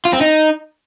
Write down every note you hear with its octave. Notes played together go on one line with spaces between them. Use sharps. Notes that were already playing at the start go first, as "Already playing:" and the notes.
F4
C4
D#4